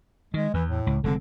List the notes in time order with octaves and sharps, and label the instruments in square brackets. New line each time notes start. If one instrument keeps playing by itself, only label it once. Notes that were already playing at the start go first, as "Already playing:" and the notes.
[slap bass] D#3 [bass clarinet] G#3
[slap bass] E2 [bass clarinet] E3
[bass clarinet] A2
[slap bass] C#2
[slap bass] F1 G#3 C4 [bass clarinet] D3